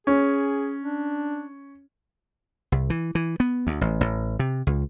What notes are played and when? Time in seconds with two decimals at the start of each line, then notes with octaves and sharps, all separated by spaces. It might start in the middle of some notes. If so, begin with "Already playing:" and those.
0.07 C#4 G#4
0.84 D4
2.72 C2
2.90 E3
3.15 E3
3.40 B3
3.67 D2
3.81 A1
4.01 A1
4.39 C3
4.67 C#2